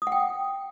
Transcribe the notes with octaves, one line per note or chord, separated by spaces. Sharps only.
D#6
F#5
G5